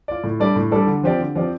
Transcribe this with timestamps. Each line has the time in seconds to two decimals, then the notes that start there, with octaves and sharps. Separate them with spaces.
0.08 F4 D5
0.24 A2
0.40 G3 D4 A4 D5
0.56 A2
0.72 G3 D4 A4 D5
0.87 D3
1.03 F3 C4 G4 D5
1.19 D3
1.35 F3 C4 G4 D5